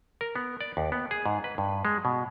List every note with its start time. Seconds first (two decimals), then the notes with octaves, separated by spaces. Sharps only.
0.21 A#4
0.36 B3
0.61 D5
0.77 D#2
0.92 B3
1.11 G#4
1.26 G#2
1.44 B4
1.58 G2
1.85 G#3
2.05 B2